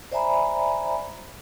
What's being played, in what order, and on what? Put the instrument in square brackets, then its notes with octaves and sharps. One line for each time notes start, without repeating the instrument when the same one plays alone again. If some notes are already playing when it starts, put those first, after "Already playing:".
[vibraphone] C5 D5 E5 G#5 A#5 B5